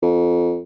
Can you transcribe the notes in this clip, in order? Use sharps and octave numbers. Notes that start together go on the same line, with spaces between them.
F2